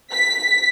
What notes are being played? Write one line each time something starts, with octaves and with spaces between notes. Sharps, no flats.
B6